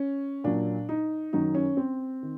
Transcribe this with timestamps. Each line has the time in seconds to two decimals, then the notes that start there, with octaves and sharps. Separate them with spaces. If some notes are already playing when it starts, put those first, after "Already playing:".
Already playing: C#4
0.44 A#2 F#3 D4
0.89 D#4
1.33 F#2 D#3 F#3 D#4
1.55 C#4
1.77 C4
2.23 D#3